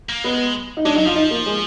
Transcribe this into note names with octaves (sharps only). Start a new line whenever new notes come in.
A#3
G#3 B3
D#4
G#3 D4
F#3 D#4
F3 F4
D#4
A#3
G#3